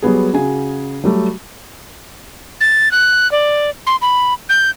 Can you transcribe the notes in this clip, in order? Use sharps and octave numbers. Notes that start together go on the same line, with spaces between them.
F#3 G3 B3 G#4
C#3 F#4 G#4 G#5
F#3 G3 A3
A6
F#6
D5
C6
B5
G6